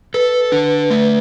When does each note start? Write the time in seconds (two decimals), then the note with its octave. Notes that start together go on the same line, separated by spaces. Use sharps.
0.14 A4 B4
0.52 D4
0.90 A3